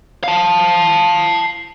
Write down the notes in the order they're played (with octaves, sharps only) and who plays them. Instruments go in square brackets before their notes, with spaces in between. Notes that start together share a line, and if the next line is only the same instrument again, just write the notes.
[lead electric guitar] F5 A5